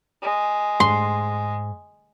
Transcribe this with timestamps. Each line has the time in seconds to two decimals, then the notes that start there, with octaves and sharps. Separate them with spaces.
0.23 G#3
0.80 G#2 C6